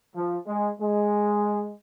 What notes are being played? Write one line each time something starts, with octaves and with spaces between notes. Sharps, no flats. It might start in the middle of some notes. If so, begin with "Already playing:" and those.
F3
G#3
G#3